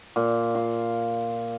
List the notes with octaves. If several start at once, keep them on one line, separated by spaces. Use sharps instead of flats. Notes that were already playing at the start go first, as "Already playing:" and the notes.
A#2
F4